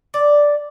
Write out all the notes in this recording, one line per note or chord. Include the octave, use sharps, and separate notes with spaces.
D5